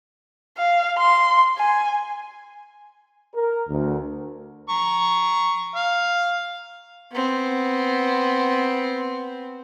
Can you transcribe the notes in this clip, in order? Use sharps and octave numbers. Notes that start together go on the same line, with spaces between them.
F5
C6
G#5
A#4
D2
A#5 C#6
F5
B3 C4